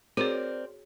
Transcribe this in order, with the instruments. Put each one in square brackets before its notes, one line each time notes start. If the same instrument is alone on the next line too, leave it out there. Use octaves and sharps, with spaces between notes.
[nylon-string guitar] C4 A#4 D5 [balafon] F#4 G#4 C#5